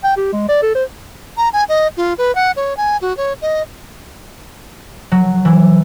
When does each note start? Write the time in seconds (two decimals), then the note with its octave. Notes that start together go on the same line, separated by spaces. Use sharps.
0.04 G5
0.17 G4
0.33 G#3
0.49 D5
0.62 A4
0.75 C5
1.37 A#5
1.53 G#5
1.69 D#5
1.97 F4
2.18 B4
2.35 F#5
2.56 C#5
2.77 G#5
3.02 F#4
3.17 C#5
3.42 D#5
5.12 F#3
5.45 E3